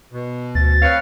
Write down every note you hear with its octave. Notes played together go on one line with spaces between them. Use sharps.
B2
D2 A6
C4 B4 C#5 F5